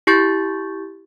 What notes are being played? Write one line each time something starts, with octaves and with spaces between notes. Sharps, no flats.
E4 G4 C#6 G6 A6